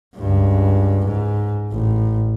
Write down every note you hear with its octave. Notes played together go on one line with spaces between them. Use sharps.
C#2 G2
G#2
A1